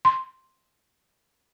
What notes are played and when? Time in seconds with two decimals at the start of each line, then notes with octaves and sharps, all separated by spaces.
0.05 C6